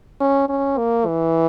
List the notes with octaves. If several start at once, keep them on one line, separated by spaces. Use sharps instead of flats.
C#4
C#4
A#3
E3